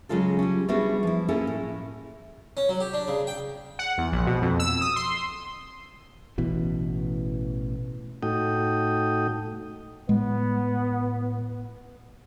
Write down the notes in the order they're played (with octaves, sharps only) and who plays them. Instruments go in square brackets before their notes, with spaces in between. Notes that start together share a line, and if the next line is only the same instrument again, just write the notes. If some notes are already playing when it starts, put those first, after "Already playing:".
[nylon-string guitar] C#3 F#3 G#3 F4 A4
G3 C#4
G3 A3 B3 D4 F#4 G#4
F3 E4
A#3 C#4 E4 G#4 A4
A2
[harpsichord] C#4
F#3
G4
D4
C#3
G5
[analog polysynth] F#5
E2
A#1
B2
F2
E6
D#6
C6
[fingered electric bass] A1 B2 E3
[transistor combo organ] A2 A3 D#4 F#4 G5 D#6
[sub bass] A2 [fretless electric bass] G#3 [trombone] B3